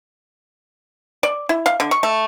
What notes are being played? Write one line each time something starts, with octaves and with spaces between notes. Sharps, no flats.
D5
E4
F5
D3
C#6
A3